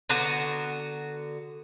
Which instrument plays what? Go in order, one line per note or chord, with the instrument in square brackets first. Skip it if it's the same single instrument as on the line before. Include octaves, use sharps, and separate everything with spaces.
[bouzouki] D3 B3 F#4 A#5